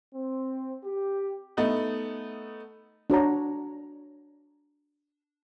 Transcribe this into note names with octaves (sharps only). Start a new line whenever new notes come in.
C4
G4
A3 B3 D#4
D4 F#4 C#5 A#5